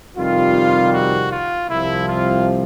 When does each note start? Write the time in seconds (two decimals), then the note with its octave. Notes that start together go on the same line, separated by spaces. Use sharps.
0.17 F2 C3 D#3 G3 F4
0.93 F#4
1.31 F4
1.69 C2 C3 F3 E4
2.08 F4